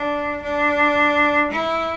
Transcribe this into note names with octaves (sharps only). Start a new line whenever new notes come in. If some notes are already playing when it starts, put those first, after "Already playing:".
Already playing: D4
D4
E4